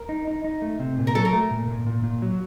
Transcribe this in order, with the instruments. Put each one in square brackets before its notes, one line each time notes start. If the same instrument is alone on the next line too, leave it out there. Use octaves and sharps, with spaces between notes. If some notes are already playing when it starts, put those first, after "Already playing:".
Already playing: [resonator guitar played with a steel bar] A#4
[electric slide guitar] D#4
D#4
D#4
A3
C3
A#2
[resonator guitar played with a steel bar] A#4
[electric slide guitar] F#3 [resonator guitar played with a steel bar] A4
[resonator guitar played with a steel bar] A#4
[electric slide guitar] A3
A#2
A#2
A#2
A#2
F#3